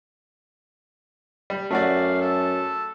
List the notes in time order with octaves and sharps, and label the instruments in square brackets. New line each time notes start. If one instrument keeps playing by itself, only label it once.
[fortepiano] G3
[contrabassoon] F#2 [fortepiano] A3 F#4 D5 [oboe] F5
[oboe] A4